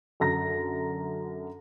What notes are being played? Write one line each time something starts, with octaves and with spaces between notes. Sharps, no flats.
F#2 D3 A#5 A#6